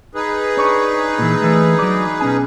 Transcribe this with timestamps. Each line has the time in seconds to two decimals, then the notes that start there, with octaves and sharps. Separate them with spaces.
0.15 D#4 G#4 B4
0.57 D4 C#5
1.19 A#2 E3
1.42 D3 E3 A3
1.79 F#3 D5
2.20 B2 C#4 G#5